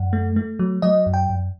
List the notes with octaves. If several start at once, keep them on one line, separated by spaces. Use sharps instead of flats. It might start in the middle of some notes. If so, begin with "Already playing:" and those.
Already playing: F#2 F#5
A3
A3
F#3
F#3 D#5
F#2
G5
F#2